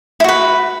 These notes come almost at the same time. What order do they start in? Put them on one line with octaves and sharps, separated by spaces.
E4 F#4 B4